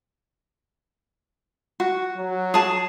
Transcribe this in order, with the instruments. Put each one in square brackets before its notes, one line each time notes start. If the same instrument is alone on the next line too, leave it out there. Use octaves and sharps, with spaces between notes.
[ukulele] F#4
[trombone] F#3
[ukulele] G#4 A5